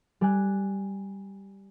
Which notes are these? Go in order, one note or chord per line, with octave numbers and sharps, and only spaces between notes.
G3 G#5 F#6